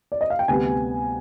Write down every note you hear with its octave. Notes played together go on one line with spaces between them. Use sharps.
D5
D#5
F5
G5
D2 C3 G3 B3 G#5